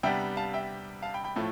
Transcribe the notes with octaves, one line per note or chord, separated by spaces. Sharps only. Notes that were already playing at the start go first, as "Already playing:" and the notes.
C3 G3 B3 D4 E5 G5
F5 A5
E5 G5
F5 A5
G5 B5
G5 B5
A2 F3 A3